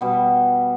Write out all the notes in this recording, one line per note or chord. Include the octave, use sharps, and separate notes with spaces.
B2 G3 B3